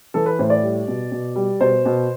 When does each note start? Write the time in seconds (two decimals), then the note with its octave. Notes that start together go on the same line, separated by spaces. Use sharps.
0.14 E3 A4
0.26 B4
0.39 A2 C5
0.50 D5
0.63 G3
0.88 B2
1.12 B2
1.36 G3
1.61 B2 C5
1.85 B2